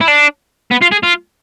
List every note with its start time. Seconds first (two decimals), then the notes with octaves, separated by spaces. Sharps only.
0.01 E4
0.08 D4
0.71 B3
0.81 F4
0.92 G#4
1.03 F4